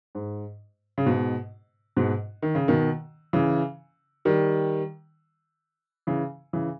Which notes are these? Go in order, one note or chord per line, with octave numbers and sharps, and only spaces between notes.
G#2
C#3
G#2 B2
G#2 B2
D#3
C#3
B2 D#3
C#3 E3
D#3 G3
C#3 E3
C#3 E3